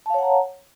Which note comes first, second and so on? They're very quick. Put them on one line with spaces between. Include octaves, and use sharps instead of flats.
A5 F5 C#5 F#5 A#5